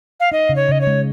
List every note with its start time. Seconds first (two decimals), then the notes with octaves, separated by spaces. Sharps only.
0.20 F5
0.32 D#4 D#5
0.49 C#3
0.56 C#5
0.68 C#3 D#5
0.81 C#5
0.87 G#3